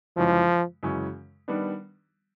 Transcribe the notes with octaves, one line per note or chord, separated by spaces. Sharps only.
F#2 C#3 E3 F3 G#3 C#4
F#2 C#3 E3 G#3 C#4
D#3 G3 B3 D4